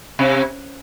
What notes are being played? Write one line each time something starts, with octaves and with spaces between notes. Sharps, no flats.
C3